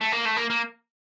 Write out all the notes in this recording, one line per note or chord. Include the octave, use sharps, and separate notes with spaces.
A3
A#3
A3
A#3
A#3